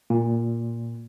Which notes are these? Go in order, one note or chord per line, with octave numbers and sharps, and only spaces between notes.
A#2